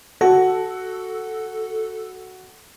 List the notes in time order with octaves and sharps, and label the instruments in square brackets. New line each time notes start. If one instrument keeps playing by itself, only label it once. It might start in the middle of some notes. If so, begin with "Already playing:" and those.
[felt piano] F#4 [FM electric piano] A4